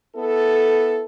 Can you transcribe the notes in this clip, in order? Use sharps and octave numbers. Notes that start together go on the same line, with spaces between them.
B3 E4 A4